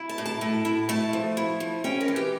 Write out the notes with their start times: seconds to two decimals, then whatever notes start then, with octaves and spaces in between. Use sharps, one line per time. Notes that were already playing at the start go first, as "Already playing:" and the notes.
Already playing: E4
0.09 A5
0.18 A2
0.26 A5
0.41 A2
0.65 E4
0.89 A3 A5
1.13 F3
1.37 E4
1.60 F3
1.84 C#4 G5
2.01 A#4
2.08 E3
2.16 G4